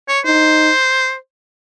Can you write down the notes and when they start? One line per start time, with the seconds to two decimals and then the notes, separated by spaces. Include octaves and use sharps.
0.08 C#5
0.25 D#4 C5